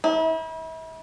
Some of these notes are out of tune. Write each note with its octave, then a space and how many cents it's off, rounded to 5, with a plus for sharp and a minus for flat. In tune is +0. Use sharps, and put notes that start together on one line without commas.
E4 -40